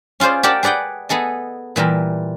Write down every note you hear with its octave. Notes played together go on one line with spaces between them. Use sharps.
C#4 F4 G#4 C5 D5
G4 A#4 D5 F#5 A5
G#4 B4 D5 F#5 G5
B3 G#4 A4 D#5
A#2 E3 G3 A#4